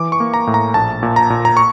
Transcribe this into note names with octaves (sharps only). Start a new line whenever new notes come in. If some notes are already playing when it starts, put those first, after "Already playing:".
Already playing: E3 D6
C#6
A#3
A#5
A2
A#5
A#1 A5
A#2
A#5
A#2
A#5
C#6